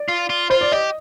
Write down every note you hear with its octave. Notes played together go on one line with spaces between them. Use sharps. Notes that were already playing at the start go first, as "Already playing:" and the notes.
Already playing: D5
F4
F4
F4 C5
D5
G4 D#5